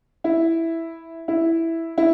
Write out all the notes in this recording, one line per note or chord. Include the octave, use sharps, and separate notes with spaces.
E4
E4
E4